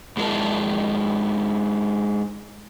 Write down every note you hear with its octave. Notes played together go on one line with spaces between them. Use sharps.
G#2 G#3 D4 E4 A#4 A5